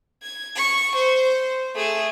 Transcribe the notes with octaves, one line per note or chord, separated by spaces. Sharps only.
G#6
C#6
C5
A3 G#4